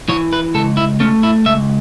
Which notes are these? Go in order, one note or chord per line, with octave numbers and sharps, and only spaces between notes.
E3 C#5
B4
C#2 A4
E4
A3 C#4
E4
C#2 E5